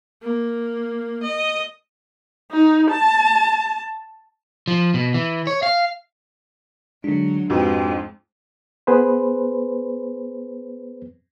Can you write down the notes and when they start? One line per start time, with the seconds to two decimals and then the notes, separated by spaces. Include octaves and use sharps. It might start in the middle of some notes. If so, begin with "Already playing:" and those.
0.23 A#3
1.23 D#5
2.51 D#4
2.90 A5
4.68 F3
4.94 B2
5.14 E3
5.47 C#5
5.63 F5
7.04 D3 F#3 G#3 D4
7.50 F2 G#2 G#3 F#4 G4 B4
8.87 B3 G#4 B4 C5